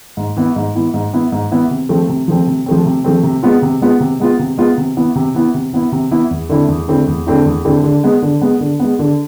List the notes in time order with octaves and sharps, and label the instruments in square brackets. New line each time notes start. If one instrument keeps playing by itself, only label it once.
[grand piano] G#2
E3 B3 E4
G#2
E3 B3 E4
G#2
E3 B3 E4
G#2
E3 B3 E4
C3
F3 A3 C4
C3
F3 A3 C4
C3
F3 A3 C4
C3
F3 A3 C4
C3
G#3 B3 F4
C3
G#3 B3 F4
C3
G#3 B3 F4
C3
G#3 B3 F4
C3
E3 B3 E4
C3
E3 B3 E4
C3
E3 B3 E4
C3
E3 B3 E4
E2
D3 A3 C4 E4
E2
D3 A3 C4 E4
E2
D3 A3 C4 E4
E2
D3 A3 C4 E4
D3
G#3 B3
D3
G#3 B3
D3
G#3 B3
D3